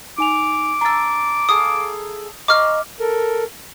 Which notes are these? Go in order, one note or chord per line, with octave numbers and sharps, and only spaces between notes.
D#4 G#5 D6 F7
D4 A#5 E6 A6
G#4 A4 F5 D#6
D#5 F5 A#5 C#6 D6 F6
A4 A#4